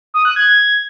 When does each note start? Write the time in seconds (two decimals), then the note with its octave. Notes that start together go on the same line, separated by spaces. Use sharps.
0.14 D#6
0.25 F#6
0.36 G#6